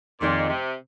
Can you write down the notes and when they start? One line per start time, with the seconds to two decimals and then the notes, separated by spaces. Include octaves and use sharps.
0.21 F2 A#2 D#3 G#3 D#4 G#4
0.48 C3